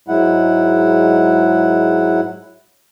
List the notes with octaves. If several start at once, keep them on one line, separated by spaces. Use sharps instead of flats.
G#2 F#3 G#3 E4 F#5